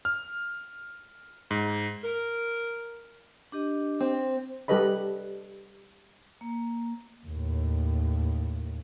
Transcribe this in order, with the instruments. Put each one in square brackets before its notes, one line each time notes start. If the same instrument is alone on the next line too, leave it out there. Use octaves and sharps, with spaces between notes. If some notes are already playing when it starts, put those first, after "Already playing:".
[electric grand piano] F6
G#2
[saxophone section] A#4
[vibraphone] D4 G4 D#5
[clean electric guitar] C4
[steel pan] G3 G4 A4 B4 D#5 B5
[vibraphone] A#3
[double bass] D#2 A2